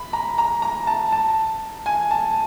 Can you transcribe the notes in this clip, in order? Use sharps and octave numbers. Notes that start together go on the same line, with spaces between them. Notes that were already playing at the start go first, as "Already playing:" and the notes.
Already playing: B5
A#5
A#5
A#5
A5
A5
G#5
A5